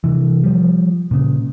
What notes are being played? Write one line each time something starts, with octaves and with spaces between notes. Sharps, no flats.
C3 E3
F3 G3
A#2 C#3